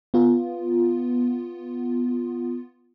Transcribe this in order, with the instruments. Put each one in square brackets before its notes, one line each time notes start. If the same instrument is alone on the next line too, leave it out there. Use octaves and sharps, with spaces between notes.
[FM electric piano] B3 F4